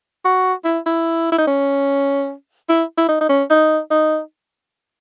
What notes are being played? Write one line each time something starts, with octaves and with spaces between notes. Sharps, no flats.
F#4
E4
E4
E4
D#4
C#4
E4
E4
D#4
D#4
C#4
D#4
D#4